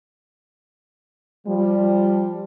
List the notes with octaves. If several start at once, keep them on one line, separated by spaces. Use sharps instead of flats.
F3 G3